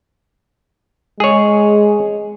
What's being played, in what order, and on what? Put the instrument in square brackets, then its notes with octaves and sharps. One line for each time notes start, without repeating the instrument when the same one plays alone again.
[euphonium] G#3 [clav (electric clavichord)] G#4 C#5